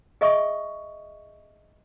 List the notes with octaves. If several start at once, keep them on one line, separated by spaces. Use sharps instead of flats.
G#4 D#5 E5 C#6 D#6